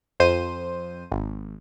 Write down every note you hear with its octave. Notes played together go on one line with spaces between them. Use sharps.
F2 C5 D#7
G#1